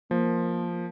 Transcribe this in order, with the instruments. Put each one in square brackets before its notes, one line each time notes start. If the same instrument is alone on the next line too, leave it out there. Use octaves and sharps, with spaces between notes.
[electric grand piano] F3 [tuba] A#3